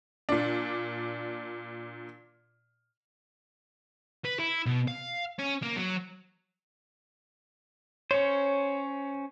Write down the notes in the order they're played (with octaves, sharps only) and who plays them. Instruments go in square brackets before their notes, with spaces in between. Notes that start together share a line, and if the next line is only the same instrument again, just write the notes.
[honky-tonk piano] A#2 D4
[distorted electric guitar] B4
E4
B2
F5
C#4
A#3
F#3
[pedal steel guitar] C#4 C5 [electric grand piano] C#5